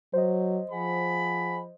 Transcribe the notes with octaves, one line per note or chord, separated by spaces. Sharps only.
F#3 C5 D#5
F3 G#4 F#5 B5